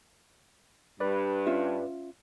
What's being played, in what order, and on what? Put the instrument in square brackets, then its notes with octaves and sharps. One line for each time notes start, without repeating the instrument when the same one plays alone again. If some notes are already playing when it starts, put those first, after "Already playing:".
[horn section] G2 [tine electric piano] B4 D5
[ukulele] C#4 F4 E5